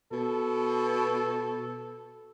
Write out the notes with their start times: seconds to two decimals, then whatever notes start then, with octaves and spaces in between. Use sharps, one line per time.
0.12 B2 A4